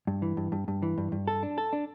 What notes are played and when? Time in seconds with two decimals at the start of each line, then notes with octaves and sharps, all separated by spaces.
0.07 G2
0.22 E3
0.37 G2
0.52 G2
0.68 G2
0.83 E3
0.98 G2
1.12 G2
1.27 A4
1.43 D4
1.58 A4
1.73 D4